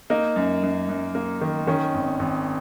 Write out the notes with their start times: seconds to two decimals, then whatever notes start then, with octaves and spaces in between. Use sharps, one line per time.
0.10 A#3 D#4
0.36 F#2
0.63 F#2
0.89 F#2
1.15 A#3
1.41 D#3
1.67 D#3 C#4
1.94 G#1
2.19 G#1